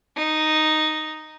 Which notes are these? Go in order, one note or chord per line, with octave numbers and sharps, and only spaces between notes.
D#4